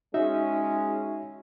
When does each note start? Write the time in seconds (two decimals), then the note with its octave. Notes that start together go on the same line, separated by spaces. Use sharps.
0.14 G#3 C#4 D#4 F#4 E5